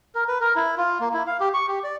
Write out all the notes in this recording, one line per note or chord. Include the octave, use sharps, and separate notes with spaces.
A#4
B4
A#4
E4
F4
A#3
E4
F5
G4
C#6
G4
D5